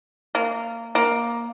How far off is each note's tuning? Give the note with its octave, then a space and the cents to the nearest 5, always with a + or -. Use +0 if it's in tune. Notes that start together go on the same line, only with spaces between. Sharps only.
A#3 -15
A#3 +10